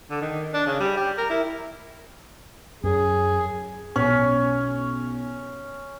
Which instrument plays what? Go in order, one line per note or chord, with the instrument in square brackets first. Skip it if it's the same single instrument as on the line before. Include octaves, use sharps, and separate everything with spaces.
[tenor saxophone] D3
D#3
D4
C#3
G3
G4
A#4
E4
[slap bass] F#2 [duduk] G#4
[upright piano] B1 [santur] C#4